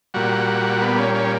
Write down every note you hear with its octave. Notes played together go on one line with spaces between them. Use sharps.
A#2 G3 F#4
B3
C#4
C#4